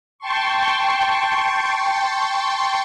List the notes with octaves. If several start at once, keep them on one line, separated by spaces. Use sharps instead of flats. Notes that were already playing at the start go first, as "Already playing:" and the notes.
G5 A5 C6 C#6